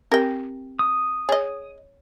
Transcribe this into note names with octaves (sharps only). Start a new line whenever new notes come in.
C4 G4 A#4 G5
D#6
G#4 C#5 D#5